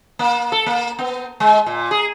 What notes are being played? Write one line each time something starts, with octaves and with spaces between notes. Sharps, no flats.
A#3
A4
A#3
B3
G#3
A#2
G#4